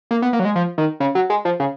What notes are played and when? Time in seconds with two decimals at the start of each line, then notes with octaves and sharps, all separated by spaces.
0.11 A#3
0.22 B3
0.33 A#3
0.40 F#3
0.45 G#3
0.56 F3
0.78 D#3
1.00 C#3
1.15 F#3
1.30 G#3
1.45 F3
1.60 C#3